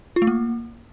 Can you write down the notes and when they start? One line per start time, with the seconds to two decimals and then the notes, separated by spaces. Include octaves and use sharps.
0.16 F4
0.22 A3
0.27 A#3